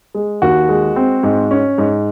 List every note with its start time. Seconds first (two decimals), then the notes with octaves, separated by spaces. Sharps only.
0.15 G#3
0.42 D#2 F#4
0.69 G#3
0.96 C4
1.23 G#2
1.51 C#4
1.78 G#2